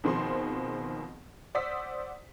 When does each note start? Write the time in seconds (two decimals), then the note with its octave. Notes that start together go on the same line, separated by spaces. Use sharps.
0.04 B2 D#3 F3 C4 G#4 C6
1.55 C5 D5 F#5 D#6 E6 B6